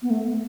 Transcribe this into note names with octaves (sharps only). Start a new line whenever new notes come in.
B3
A3